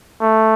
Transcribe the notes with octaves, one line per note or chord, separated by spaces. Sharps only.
A3